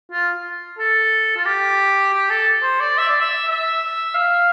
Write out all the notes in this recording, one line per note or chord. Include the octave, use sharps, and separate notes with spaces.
F4
A4
F4
G4
G4
A4
C5
D5
E5
D5
E5
E5
F5